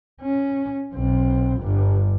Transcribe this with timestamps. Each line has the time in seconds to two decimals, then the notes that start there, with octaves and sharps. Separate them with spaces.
0.22 C#4
0.94 B1 C4
1.59 G1 G2